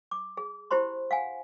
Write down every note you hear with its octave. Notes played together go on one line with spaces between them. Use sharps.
D6
G#4
E4 G4 C5 B5 C6
F5 F#5 G#5